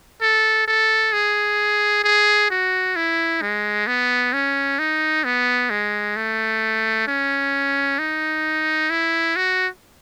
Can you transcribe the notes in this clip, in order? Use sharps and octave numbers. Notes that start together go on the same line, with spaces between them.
A4
A4
G#4
G#4
F#4
E4
G#3
B3
C#4
D#4
B3
G#3
A3
C#4
D#4
E4
F#4